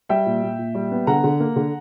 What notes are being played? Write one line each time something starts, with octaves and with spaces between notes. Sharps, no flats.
G3 E5 G5
A#2
A#2
A#2
G3
B3
D3 F#5 A#5
D3
A#3
D3